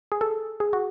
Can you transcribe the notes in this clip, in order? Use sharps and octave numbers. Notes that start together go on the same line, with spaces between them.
G#4
A4
G#4
F#4